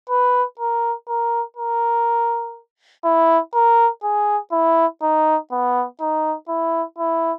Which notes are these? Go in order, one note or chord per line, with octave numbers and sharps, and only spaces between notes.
B4
A#4
A#4
A#4
E4
A#4
G#4
E4
D#4
B3
D#4
E4
E4